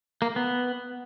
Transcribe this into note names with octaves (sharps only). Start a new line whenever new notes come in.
A#3
B3